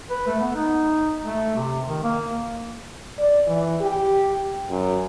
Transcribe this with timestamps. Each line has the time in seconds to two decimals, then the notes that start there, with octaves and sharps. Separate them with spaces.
0.10 B4
0.27 A3
0.40 B3
0.55 D#4
1.24 A3
1.55 C3
1.86 D#3
2.03 A#3
3.19 D5
3.47 E3
3.81 G4
4.70 F#2